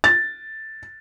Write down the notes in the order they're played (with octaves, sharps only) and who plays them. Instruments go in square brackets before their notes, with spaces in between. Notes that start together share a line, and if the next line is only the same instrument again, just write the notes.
[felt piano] A6